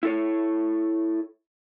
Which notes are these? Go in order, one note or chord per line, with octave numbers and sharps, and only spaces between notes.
E4 A4 C#5